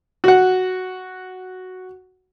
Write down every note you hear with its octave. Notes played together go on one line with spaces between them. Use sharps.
F#4 F#5